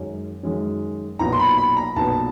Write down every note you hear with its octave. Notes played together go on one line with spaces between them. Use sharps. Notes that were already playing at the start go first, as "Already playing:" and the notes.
Already playing: F#2 D#3 G#3 C#4
F#2 D#3 G#3 C#4
B1 A#2 F#3 B3 A#5
C6
B5
B5
A#5
B1 A#2 F#3 B3 A5